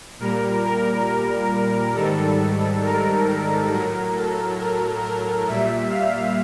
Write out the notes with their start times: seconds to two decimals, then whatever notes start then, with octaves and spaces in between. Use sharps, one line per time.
0.19 A#2 G3 A#4
0.64 A#4
1.95 G#2 D#3 G3 A4
2.83 A#4
3.26 A#4
3.71 A2 F#3 A#4
4.15 A4
4.59 A#4
5.02 A#4
5.47 A#2 G3 E5
5.90 F5